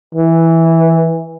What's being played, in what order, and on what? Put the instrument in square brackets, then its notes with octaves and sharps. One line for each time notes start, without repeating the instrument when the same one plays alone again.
[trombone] E3